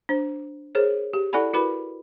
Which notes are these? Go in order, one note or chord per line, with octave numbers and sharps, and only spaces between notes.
D4 C5
G#4 A#4 C5 C#5
G4
E4 A4 D5 F#5 G#5 B5
E4 F#4 A#4 B4 B5